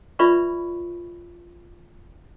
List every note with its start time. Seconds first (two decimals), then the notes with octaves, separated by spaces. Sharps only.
0.19 F4 B4 D5 E5 B5 C#6